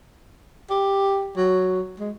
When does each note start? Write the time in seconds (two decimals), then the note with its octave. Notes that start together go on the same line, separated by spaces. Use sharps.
0.70 G4
1.37 F#3
2.00 G#3